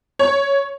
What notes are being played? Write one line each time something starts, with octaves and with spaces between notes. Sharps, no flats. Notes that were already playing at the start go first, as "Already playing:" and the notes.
C#5